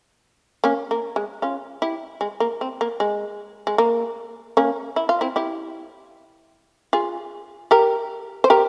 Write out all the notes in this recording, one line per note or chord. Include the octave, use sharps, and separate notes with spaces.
A#3 C#4
A#3
G#3
C#4 F4
E4 G4
G#3
A#3
C4
A#3
G#3
G#3
A#3
A#3 C#4
E4
F4
C4 E4
E4 G4
F4 G#4
G4 A#4
C5
G4 A#4